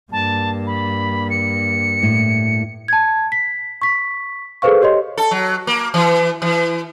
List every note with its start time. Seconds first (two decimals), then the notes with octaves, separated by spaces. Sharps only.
0.12 G2 A#3 A5
0.67 B5
1.30 C#7
2.02 A2
2.88 A5 G#6
3.32 B6
3.82 C#6 B6
4.62 G#4 A4 B4 C5 F5 C#6
4.82 G4 C#5 D#5 C6
5.17 A4
5.31 F#3
5.67 A#3
5.94 E3
6.42 E3